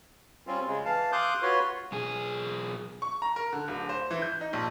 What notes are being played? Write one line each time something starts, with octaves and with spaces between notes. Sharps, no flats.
G3 C4 C#4 F4
C#3 G#3
E3 F5 A5
F5 C6 D6 D#6 F#6 G6
F4 F#4 B4 C#5 C6
B1 G#4
C#6
A#5
A#4
D3
D1
C5
E3
G6
D#4
A#1